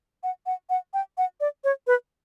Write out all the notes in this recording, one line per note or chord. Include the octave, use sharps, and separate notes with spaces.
F#5
F#5
F#5
G5
F#5
D5
C#5
B4